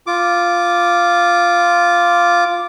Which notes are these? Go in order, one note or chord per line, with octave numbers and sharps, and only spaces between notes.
F4 D6